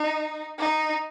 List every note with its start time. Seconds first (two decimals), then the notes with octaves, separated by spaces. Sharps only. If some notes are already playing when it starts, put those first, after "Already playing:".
Already playing: D#4
0.59 D#4